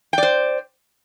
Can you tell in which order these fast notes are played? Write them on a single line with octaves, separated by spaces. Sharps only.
G5 D5 C5